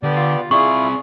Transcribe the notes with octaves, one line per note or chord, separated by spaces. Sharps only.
D3 B3 G4 D5
F4
C4 E4 F4 G#4 D5 C#6